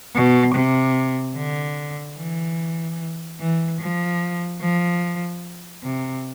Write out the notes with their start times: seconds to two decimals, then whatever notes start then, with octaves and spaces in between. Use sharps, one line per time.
0.15 B2
0.54 C3
1.36 D3
2.18 E3
3.40 E3
3.80 F3
4.61 F3
5.84 C3